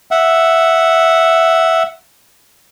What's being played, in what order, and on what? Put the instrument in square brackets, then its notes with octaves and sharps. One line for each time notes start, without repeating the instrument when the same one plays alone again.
[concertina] E5 F#5